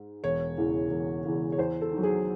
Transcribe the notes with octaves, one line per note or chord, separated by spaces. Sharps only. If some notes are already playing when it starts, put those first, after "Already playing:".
Already playing: G#2
E1 C#5
E2 C#3 E3
E1
E2 C#3 E3
C#5
E2 C5
A4
D#3 F#3
G#4